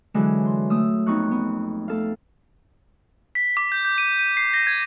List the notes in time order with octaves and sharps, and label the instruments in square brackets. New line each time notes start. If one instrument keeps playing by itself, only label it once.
[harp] D3 E3 F#3 G#3
C6
A3 D#6 E6
F2 B3 D#4 F4 C#6 F#6
B3
A3 A4 F5
[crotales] B6
D6
G6
G6
D#7
D#7
C7
A#6
G#6